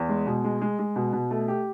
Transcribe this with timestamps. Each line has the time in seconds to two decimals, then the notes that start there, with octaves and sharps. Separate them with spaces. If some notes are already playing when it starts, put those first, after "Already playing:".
Already playing: E2
0.09 G#3
0.27 B2
0.44 G#3
0.61 G#3
0.79 G#3
0.96 B2
1.13 B2
1.31 A3
1.48 G4